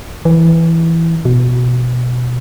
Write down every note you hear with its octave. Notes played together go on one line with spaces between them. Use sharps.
E3
B2